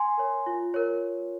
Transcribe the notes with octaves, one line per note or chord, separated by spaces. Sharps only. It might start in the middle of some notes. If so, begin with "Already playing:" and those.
Already playing: G#5 C6
A#4 C#5
F4
A#4 C#5